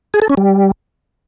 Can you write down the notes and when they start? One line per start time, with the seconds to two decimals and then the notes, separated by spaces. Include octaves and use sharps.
0.14 G#4
0.22 A4
0.30 C#4
0.37 G3